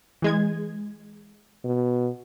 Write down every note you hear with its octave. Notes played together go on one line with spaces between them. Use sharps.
E3 G#3 G#6
B2